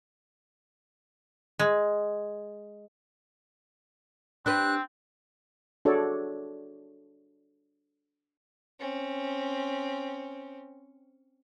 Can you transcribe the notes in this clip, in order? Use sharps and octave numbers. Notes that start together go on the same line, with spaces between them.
G#3
C4 D4 G4 B4 F#6
D4 F#4 G#4 A4 C#5 D5
C4 C#4